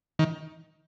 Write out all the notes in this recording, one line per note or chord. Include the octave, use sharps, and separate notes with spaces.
D#3